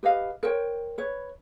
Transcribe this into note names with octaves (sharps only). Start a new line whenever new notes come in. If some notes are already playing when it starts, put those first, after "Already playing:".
G4 B4 D#5 F5
A#4 C5 C#5 G5
B4 C#5